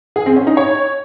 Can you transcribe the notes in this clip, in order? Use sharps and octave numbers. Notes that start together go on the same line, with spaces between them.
G#4
C4
C#4
D#4
C#5